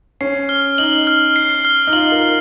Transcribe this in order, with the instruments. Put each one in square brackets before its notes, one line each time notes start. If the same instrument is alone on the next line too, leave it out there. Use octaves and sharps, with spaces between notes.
[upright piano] C#4 [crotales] C7
[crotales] F6
[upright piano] D#4 [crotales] F#7
[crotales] F6
C7
F6
[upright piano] D#4
[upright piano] F4 [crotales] F#7
[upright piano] A#4
[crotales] F6